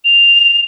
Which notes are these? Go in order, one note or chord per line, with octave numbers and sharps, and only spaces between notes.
F7